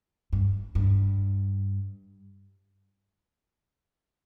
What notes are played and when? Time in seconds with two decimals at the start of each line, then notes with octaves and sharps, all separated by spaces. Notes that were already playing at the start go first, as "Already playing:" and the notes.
0.33 G2
0.75 G2